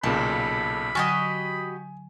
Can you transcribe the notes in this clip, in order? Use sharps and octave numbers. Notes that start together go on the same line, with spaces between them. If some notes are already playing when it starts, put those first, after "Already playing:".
B1 A#2 C#3 A4 B5
D3 F#3 F#4 G4 D#5 G#5